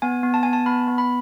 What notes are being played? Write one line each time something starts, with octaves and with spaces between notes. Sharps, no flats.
B3 G#5
B3
A5
B3 G#5
A5
B3 B5
B3
B5